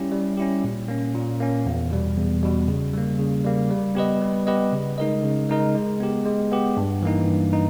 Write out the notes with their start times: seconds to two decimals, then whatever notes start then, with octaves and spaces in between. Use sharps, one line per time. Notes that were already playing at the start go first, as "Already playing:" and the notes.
Already playing: G3 C#4 E4 G4
0.12 G3
0.37 C#4 E4 G4
0.64 A#2
0.88 A#3 C#4
1.15 A#2
1.40 A#3 C#4
1.66 E2
1.91 B2 G3
2.17 E2
2.43 B2 G3
2.68 C#3
2.94 G3 A#3
3.19 C#3
3.44 G3 A#3
3.70 G3
3.95 B3 G4 B4 D#5
4.22 G3
4.46 B3 G4 B4 D#5
4.72 C#3
4.98 G#3 D#4 A#4 D#5
5.24 C#3
5.49 G#3 D#4 A#4 D#5
5.75 G#3
6.00 B3 G4
6.25 G#3
6.52 B3 G4
6.77 G2
7.03 E3 A#3 D#4
7.27 G2
7.53 D#4